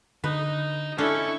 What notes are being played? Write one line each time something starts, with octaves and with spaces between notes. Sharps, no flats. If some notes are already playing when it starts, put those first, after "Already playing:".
D3 D#4 B4
C#4 D4 E4 A4 C#6